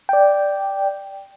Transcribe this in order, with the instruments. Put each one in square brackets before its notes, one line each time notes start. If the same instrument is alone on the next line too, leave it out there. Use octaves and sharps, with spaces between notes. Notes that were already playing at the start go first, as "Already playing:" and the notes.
[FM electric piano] D5 G5